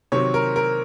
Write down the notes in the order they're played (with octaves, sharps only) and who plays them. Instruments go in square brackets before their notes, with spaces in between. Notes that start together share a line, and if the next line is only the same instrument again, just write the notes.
[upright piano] C3 D#3 F#3 C4 C#5
A#4
A#4